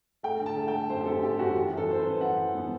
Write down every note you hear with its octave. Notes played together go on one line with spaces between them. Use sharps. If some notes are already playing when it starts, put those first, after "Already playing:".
A3 G5
D3
A5
A3
G5
A3
F#2 C5
G4
F#2 A4
F#2 G4
F#2 F#4
E3
F#2
A4
F#2 C5
F#2 B4
F#2 F#5
E3
B3